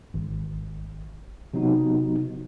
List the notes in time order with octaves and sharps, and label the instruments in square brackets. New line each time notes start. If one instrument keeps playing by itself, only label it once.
[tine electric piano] G#1
C3 F#3 B3 D#4 F#4